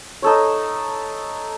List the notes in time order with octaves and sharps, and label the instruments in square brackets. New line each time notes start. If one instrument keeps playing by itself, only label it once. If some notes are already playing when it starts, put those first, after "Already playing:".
[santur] D#4 A4 C#5